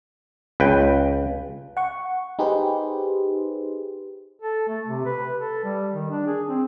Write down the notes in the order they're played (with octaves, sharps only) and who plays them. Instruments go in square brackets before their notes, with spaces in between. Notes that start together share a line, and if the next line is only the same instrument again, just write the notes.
[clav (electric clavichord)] C#2 B4 G5
[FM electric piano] F#5 C#6
D#4 G4 G#4 B4 C5
[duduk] A4
A3
C3
B4
A4
G3
D#3
D4
G#4
C4